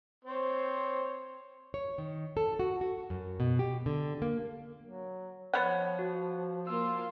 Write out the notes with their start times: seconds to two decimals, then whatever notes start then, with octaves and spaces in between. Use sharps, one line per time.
0.25 C4 C5 C#5
1.74 C#5
1.98 D#3
2.37 A4
2.59 F#4
2.81 F#4
3.10 F#2
3.40 B2
3.59 G4
3.86 D3
4.22 A#3
4.86 F#3
5.54 F3 B3 C#5 F#5
5.99 F#4
6.67 A#3 F4 E6